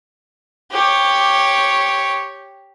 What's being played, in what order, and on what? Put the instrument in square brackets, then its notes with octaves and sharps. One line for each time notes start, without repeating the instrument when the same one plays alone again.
[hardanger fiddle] G4 C#5